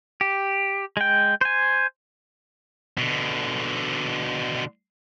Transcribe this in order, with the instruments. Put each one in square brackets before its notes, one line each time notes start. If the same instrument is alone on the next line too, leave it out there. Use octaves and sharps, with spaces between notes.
[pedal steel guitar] G4
G#3 G5
C5 G#5
[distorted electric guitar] B2 D3